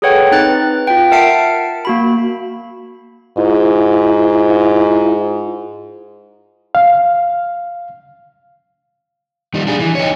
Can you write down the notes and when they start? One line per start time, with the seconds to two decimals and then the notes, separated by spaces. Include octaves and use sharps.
0.02 G#4 A4 B4 C#5 F#5 G5
0.32 C4 D#4 B4 F#6 A6
0.87 F4 G5
1.11 A#4 E5 F#5 A5 C7 D7
1.85 A#3 F#4 B5
3.38 G#2 E4 F4
6.75 F5
9.54 D#3 G3
9.67 D4 G#4
9.80 E3
9.95 D#4 C#5